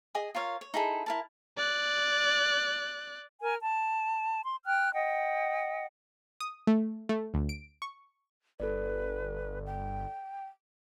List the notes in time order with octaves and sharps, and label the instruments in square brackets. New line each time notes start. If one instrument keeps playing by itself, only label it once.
[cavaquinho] G#4 D#5 G#5 D#6
F4 A#4 C#5 F5
C#5
D#4 E4 G#4 A4
E4 A#4 A5
[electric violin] D5 F#6
[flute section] A#4 G#5 F6
A5
C6
G5 F6 F#6
D#5 F#5 G5
[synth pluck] D#6
A3
A3
D2
D7
C#6
[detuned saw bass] G1 [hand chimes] A4 D5 [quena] B4
[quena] G5